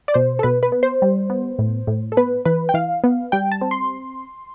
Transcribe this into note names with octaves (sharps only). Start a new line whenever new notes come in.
D5
B2 C5
A4
B2 B4
B4
B3
C5
G3
B3
A2
A2
A4
B3 B4
E3 B4
G5
E3 F5
B3
G3 G5
A5
C4
C6